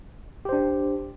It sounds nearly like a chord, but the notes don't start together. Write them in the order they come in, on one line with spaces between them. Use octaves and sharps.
G4 C5 D4